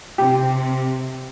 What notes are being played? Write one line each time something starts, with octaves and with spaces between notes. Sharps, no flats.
C3 G4